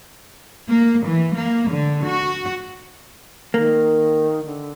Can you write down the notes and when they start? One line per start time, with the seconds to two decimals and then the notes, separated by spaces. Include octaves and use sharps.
0.68 A#3
1.04 E3
1.35 A#3
1.70 D3
2.04 F#4
3.54 D#3 A#3
4.45 D3